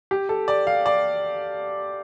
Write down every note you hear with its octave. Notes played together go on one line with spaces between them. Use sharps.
G4
A4
D5
F5
D5